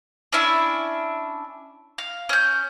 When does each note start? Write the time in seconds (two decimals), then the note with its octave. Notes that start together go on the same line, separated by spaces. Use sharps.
0.32 C#4 D4 E4 E5
1.98 F5
2.29 C#4 G6